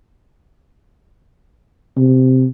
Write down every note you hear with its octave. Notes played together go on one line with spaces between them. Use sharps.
C3